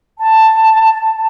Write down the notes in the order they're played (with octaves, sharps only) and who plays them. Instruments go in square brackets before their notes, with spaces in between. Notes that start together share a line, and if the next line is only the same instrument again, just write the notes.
[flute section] A5